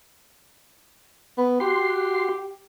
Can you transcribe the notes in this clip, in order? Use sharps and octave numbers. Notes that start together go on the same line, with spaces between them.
B3
F#4 G4 C6